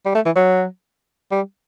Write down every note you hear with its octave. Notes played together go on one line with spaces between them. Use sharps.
G3
A3
E3
F#3
G3